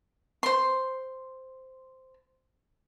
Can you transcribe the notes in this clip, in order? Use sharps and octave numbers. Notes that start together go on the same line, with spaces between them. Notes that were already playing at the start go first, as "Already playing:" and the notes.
C5 C6